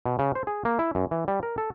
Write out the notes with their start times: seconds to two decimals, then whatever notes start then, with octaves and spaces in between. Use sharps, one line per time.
0.06 B2
0.19 C#3
0.35 C5
0.47 G#4
0.65 A#3
0.79 E4
0.95 F#2
1.11 E3
1.28 G3
1.43 A#4
1.58 A4